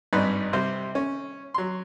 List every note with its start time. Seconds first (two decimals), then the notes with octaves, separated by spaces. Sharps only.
0.13 G#1 G2 D#4 B4 D5
0.53 C3 G3 C5
0.95 C#4
1.54 F#3 C6